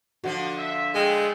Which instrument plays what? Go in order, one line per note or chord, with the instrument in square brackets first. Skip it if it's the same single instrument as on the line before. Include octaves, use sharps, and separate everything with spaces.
[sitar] D3 F3 D4 [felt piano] F#4
[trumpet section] E5
[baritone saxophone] G#3 [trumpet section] A3 B3 C4 [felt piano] G5